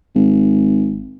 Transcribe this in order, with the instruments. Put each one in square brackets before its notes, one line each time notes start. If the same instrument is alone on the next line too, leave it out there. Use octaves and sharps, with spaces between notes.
[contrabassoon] G#1